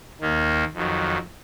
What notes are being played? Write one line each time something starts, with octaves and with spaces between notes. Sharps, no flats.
D#2 D#3 A#3
F2 D#3 F#3